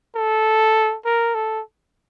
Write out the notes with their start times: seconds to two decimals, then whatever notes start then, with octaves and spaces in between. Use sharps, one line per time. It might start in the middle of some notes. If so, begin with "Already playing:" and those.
0.15 A4
1.05 A#4
1.35 A4